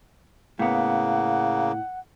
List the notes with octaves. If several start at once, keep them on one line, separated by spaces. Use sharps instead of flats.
A2 C#3 A#3 B3 F#5